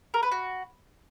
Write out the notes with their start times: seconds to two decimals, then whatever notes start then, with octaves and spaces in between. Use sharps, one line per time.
0.14 A#4
0.23 B4
0.32 F#4